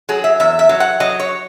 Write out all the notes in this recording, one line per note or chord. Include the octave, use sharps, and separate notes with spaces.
F#3 G#4
E5
E2 E5
E5
F#3
F#5
F#3 D#5
C#5